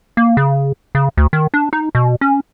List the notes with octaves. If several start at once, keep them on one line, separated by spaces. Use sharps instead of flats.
A#3
C#3
C#3
D2
D#3
D4
D#4
B2
C#4